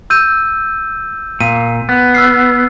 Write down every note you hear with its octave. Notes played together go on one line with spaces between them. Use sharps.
E6 G6 D#7
A#2 D#7
B3
E6 F6 C7